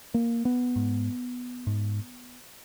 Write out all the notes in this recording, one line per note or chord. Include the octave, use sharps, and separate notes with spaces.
A#3
B3
G#2
G#2